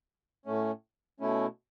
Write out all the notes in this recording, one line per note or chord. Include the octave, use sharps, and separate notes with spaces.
A2 A3 C#4
B2 A3 C#4 E4